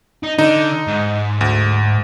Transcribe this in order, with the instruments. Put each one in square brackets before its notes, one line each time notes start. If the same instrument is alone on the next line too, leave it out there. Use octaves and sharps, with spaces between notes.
[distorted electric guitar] D#4
[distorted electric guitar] D3 [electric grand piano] D#4
[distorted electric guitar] G#2
[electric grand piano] D2